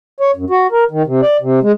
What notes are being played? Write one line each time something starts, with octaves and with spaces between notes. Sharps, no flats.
C#5
F#2
F#4
A#4
D#3
C3
D5
C3
G#3